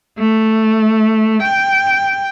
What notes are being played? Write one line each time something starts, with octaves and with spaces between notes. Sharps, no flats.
A3
G5